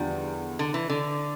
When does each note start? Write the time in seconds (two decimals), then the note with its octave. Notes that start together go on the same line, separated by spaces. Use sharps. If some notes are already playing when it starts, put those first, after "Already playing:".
Already playing: E2 D3 F3 G3
0.59 D3
0.74 E3
0.90 D3